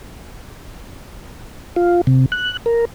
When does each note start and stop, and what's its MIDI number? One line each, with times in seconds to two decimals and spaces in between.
1.76 2.01 65
2.07 2.26 48
2.32 2.57 90
2.66 2.85 70